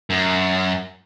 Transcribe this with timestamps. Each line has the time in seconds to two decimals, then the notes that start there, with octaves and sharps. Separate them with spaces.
0.10 F#2